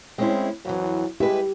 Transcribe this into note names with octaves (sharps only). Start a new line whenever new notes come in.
G#3 C4 C#4 E4
F2 E3 F#3
G#3 E4 G4 B4